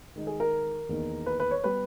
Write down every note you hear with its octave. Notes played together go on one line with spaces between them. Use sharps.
D#3 G#3 D#4
G#4
A#4
E2 D#3 A#3 D#4
B4
B4
C#5
G3 B3 B4